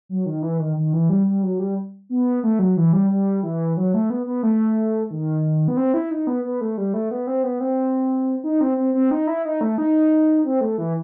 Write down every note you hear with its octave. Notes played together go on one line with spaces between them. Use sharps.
F#3
D#3
E3
D#3
D#3
E3
G3
G3
F#3
G3
B3
A3
F#3
E3
G3
G3
E3
F#3
A3
B3
B3
A3
D#3
B3
C4
E4
D#4
B3
B3
A3
G3
A3
B3
C4
B3
C4
D#4
C4
C4
C4
D#4
E4
D#4
A3
D#4
C4
A3
E3